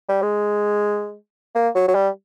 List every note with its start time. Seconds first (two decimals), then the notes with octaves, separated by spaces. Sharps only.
0.09 G3
0.23 G#3
1.55 A#3
1.75 F#3
1.88 F#3
1.95 G3